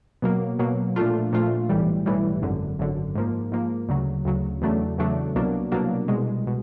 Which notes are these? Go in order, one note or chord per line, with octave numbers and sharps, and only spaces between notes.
B2 F#3 A#3
B2 F#3 A#3
A#2 F3 A3 D4 F4
A#2 F3 A3 D4 F4
B1 A2 E3 G3
B1 A2 E3 G3
G#1 F#2 D3
G#1 F#2 D3
G#2 F3 A#3
G#2 F3 A#3
D2 C#3 F#3
D2 C#3 F#3
E2 C#3 F#3 A3 D4
E2 C#3 F#3 A3 D4
C2 B2 F#3 A#3 D4
C2 B2 F#3 A#3 D4
C2 B2 G#3
B2